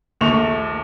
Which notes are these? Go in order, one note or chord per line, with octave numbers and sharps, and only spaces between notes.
A#1 D#2 A3 C#6 F7